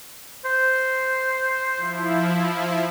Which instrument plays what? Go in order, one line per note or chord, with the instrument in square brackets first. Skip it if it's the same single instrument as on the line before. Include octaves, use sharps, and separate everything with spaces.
[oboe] C5
[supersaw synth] F3 E4